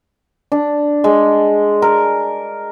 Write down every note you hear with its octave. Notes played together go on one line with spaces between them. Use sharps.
D4
G#3
A#4